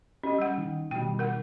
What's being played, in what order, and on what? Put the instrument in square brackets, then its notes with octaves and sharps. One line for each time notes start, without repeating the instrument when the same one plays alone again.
[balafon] C#4 [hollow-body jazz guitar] G4 D#5
[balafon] G3 F#5
[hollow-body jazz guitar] D#3
[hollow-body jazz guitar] B2 D#3 G3 [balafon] G5
[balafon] A#4 F#5